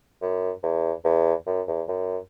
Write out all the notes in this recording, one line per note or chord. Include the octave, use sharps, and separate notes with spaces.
F#2
E2
E2
F#2
E2
F#2